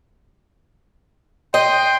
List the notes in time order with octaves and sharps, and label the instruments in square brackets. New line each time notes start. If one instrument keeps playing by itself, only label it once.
[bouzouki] D#5 [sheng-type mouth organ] G5 C6